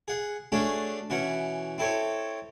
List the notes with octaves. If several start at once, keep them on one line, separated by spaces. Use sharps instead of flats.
G#4 F#5
A3 C#4 D4 F#4 G#4
B2 E3 C#4 F#5
C4 E4 A4 C#5